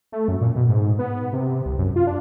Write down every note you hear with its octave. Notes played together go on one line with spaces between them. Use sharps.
A3
F#2
A#2
B2
G#2
B3
C3
C2
F#2
F4
D4